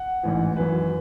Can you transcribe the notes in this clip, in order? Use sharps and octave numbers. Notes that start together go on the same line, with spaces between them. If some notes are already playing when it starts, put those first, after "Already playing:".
Already playing: F#5
A1 G#2 E3
G#1 F#2 E3 B4